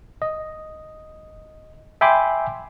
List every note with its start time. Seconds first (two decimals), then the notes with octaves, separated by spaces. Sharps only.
0.22 D#5
2.01 E5 G5 G#5 B5 C6 D6